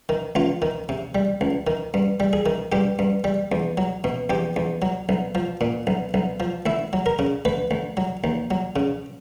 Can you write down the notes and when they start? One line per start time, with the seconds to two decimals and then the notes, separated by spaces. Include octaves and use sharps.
0.09 D#3
0.35 C#2 F4
0.62 D#3
0.89 C3
1.15 G3
1.41 C#2
1.67 D#3
1.94 G2
2.20 G3
2.33 G#4
2.46 D#3
2.72 G2 G4
2.99 G2
3.24 G3
3.52 E2
3.77 F#3
4.04 B2
4.30 E2 G4
4.56 E2
4.82 F#3
5.09 B1
5.35 F3
5.61 A#2
5.87 B1
6.14 B1
6.40 F3
6.66 D2 E4
6.93 F#3
7.06 A#4
7.19 C#3
7.45 D2 B4
7.71 D2
7.97 F#3
8.24 D#2
8.51 F#3
8.76 C#3